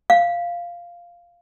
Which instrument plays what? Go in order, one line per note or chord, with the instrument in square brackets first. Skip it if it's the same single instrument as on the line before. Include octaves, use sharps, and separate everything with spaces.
[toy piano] F5